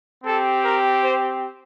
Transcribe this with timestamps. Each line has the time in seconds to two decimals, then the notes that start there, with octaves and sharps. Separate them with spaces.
0.24 C4 G4 A4
0.63 A#4
1.02 C5